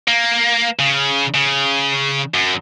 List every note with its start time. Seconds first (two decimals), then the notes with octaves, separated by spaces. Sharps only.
0.08 A#3
0.79 C#3
1.34 C#3
2.34 F#2